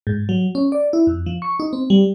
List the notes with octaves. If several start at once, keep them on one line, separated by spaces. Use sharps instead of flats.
G#2
F#3
C#4
D5
E4
F2
F3
C#6
D#4
C4
G3